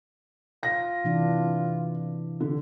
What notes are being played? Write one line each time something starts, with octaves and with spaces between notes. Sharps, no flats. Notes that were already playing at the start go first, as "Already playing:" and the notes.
F4 A#6
C3 E3 D4
D3